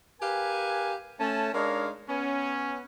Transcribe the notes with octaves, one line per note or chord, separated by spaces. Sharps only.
G4 A#4 B4 F5 G#5
A3 C#4 A5
G#3 D4 D#4 A#4 C#5 F5
B3 C#4